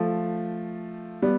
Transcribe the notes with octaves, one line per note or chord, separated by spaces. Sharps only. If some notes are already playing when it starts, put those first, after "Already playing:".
Already playing: F3 A3
G3 B3